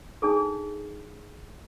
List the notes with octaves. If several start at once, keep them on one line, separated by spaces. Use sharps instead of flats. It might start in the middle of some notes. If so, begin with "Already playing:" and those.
D4 D#4 G#4 A4